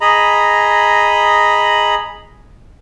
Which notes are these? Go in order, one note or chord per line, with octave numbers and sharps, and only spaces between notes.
G#4 D#5 A#5 B5